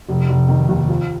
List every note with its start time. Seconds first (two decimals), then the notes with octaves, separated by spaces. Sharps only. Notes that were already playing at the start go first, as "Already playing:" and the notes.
0.09 F1
0.29 F1
0.49 D#3
0.69 D#2
0.89 F3